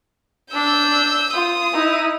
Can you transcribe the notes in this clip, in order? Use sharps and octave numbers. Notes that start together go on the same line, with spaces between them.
D4 E6 G6
F4 D#6
D#4 E4